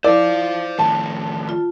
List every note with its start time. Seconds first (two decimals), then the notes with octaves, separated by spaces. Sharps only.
0.04 E4 C5 D5 F5
0.79 A2 D#3 A5
1.49 F4